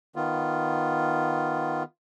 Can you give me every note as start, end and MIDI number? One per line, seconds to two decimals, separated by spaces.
0.16 1.83 51
0.16 1.83 59
0.16 1.83 65